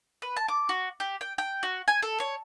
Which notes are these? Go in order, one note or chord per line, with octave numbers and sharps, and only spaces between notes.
B4
A5
D6
F#4
G4
G5
G5
F#4
G#5
A4
C#5